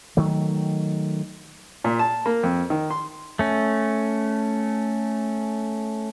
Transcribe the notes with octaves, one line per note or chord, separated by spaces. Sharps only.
D#3 F#3 A3
A#2
A5
A#3
F2
D#3
C6
A3 C#4